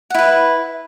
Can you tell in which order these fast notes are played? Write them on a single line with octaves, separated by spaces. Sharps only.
F#5 E4 B4